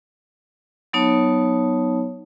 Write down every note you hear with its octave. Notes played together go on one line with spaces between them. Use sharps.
F#3 B3 D#4 C#5 A5